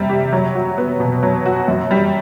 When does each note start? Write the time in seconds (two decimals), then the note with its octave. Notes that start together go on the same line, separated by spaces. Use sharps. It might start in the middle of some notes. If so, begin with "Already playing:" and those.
Already playing: C3 G3
0.09 G4
0.32 F#3
0.55 F#4
0.78 B3
1.00 B2
1.23 F#3
1.46 F#4
1.68 F#2
1.91 G3